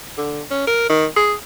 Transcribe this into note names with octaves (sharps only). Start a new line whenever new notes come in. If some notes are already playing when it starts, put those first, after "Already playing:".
D3
C#4
A#4
D#3
G#4